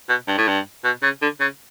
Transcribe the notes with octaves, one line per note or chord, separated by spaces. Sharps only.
B2
G2
A2
G2
B2
C#3
D3
C#3